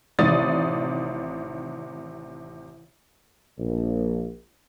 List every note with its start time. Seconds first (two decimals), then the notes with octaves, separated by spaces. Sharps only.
0.19 A1 C3 D#3 D5 D#6 A6
3.59 A#1